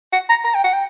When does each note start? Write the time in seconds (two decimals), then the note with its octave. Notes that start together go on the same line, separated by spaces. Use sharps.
0.13 F#5
0.29 A#5
0.44 A#5
0.55 G5
0.64 F#5
0.73 G5